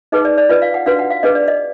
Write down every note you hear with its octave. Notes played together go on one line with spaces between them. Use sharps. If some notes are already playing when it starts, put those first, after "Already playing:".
D#4 G#4 B4 D#5
D5
D5
F4 B4 D#5
F5
F#5
D4 F#4 B4 F5
F#5
F5
D4 G#4 B4 D#5
D5
D#5